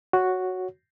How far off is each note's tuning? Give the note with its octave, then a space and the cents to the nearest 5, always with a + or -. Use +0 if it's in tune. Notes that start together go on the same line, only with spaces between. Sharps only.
F#4 +0 C#5 +0